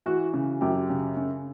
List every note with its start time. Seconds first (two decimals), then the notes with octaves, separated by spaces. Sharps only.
0.06 E3 F#4
0.34 C#3
0.61 F#2 G4
0.90 C#3
1.17 C#3